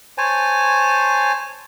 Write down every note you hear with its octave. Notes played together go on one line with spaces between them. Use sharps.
C5 C#5 G#5 A5